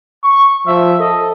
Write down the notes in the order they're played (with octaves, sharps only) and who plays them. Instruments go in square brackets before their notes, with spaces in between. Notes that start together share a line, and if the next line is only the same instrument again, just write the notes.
[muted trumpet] C#6
[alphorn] F3 [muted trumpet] E5
[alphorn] A4 [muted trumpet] D#5